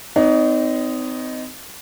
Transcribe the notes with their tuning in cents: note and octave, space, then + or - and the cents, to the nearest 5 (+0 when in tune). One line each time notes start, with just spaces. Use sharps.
C4 -35 D#4 +0 C#5 +45